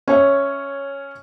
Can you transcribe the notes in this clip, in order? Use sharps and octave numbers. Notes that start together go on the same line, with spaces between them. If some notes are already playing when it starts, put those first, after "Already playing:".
C#4 C#5 E5